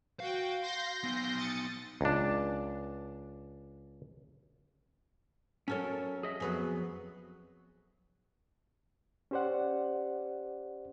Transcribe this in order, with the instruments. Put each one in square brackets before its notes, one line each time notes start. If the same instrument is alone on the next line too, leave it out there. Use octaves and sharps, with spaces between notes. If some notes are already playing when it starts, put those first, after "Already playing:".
[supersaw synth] F#4 G5 [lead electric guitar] F5
[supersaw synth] C6 G6 A#6
[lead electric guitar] B3 D#4
[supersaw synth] D#6 A6 C#7
[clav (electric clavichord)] C#2 D4
[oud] F#3 A4 C#5 [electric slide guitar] C#4 A#4
[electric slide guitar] G#4 D#5 E5
[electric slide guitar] F2 F#3 B3 [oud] G#4 B4
[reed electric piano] C#4 G4 C5 D5 F#5